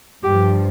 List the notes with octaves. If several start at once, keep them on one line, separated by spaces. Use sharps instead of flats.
G2 F3 G4